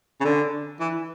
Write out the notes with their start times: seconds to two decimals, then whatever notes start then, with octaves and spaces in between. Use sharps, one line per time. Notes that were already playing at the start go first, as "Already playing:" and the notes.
0.21 C#3
0.25 D3
0.80 E3